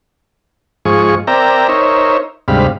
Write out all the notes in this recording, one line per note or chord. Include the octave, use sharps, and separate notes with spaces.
G#2 F3 G#4 C#6
C4 A#4 D5 E5 G5 A#5
D#4 A#4 C5 C#5 E5
D2 G#2 C3 G3 F5 B5